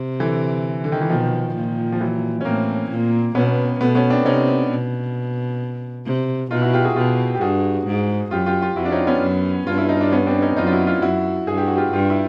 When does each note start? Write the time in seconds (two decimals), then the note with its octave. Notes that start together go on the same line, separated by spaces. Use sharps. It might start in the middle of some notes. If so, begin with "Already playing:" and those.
Already playing: C3
0.20 D3 E3
0.84 D3
0.92 D#3
1.01 E3
1.09 B2 D#3 F3
1.55 A#2
1.92 F3
2.00 E3 F#3
2.41 C#4
2.45 A2 A#3 C4
2.90 A#2
3.35 B2 B3 C#4
3.80 B2 A3 B3
3.95 B3 C#4
4.10 C4 D4
4.25 C3 C#4 D#4
4.71 B2
6.06 C3
6.51 B2 D#4 F4
6.62 E4 F#4
6.74 F4 G4
6.85 F#4 G#4
6.96 B2 F4 G4
7.35 G4
7.41 G2 F#4 G#4
7.87 G#2
8.31 F#2 F4 G4
8.46 F4 G4
8.61 F4 G4
8.76 F2 E4 F#4
8.85 D4
8.92 C#4 D#4
9.07 B3 C#4
9.22 F#2
9.67 G2 F4
9.78 E4
9.89 D#4
10.01 D4
10.12 B3 C#4
10.27 C4 D4
10.42 C#4 D#4
10.57 F#2 D#4 F4
10.67 F4
10.72 E4 F#4
10.87 D#4 F4
11.02 F#2 E4 F#4
11.47 G2 G#4
11.58 G4
11.68 F#4
11.77 F4 G4
11.92 G2 F4 G4
12.10 E4